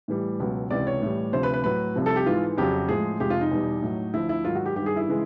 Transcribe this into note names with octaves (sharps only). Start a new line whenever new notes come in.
A2 E3 G3
C#2 B2 F#3
C#2 C3 E3 D5
C#5
A2 E3 G3
D2 C3 F3 C5
B4
B4
A2 F#3 B4
C2 C3 F3
A4
G4
G#2 E3 G#3 F4
F2 C#3 F#3 G4
A2 F3 G#3 G#4
F2 C3 F3 G#3 G4
F4
D#4
E2 B2 G3
A2 F#3
D2 D3 F3 E4
E4
G#2 D#3 F#3 F4
F#4
G4
G2 D#3 G3 G4
G#4
E4
C#3 E3 G#3